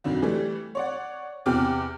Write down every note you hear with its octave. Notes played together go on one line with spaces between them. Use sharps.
F2 D3 D#3 F#3
E3 G3 A3
C#5 D5 F#5
E2 C3 G4 G5 D6 F6